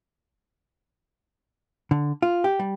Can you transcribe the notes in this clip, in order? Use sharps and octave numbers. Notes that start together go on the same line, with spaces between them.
D3
F4
G4
G3